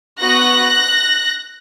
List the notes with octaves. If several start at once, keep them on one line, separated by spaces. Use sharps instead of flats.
B3 F#4 F#6 A#6